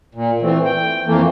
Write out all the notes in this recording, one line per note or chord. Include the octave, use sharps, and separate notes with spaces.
A#2
E3 A3 C4
G5
F2 E3 A3 A#3